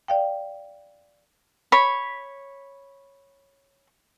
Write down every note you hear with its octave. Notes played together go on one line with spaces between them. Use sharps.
D5 F5 G5
C#5 B5